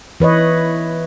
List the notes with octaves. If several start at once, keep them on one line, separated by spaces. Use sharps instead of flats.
E3 B4 C#5 D#5